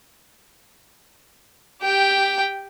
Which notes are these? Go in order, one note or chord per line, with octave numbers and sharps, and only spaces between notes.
G4 G5